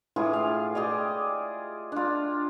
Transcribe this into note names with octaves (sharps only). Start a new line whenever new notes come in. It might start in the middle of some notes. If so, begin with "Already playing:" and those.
A2 E3 F4 G#4
F5
G4 G#4 D5 D#5
D4 F4